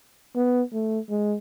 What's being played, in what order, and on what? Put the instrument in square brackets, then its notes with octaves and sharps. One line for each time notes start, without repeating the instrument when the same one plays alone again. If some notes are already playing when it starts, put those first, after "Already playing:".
[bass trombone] B3
A3
G#3